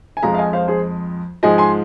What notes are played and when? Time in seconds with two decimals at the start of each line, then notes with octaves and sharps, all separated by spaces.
0.17 G#5
0.23 F2 F3 G#3 F5 A#5
0.35 F5
0.38 D#5 G#5
0.53 C5 F5
0.68 G#4 C5
1.43 G#2 F3 G#3 D#5 G#5
1.58 G#5 C6